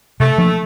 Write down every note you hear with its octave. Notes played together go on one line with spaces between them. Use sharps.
C3 A3
F3 A#3 D4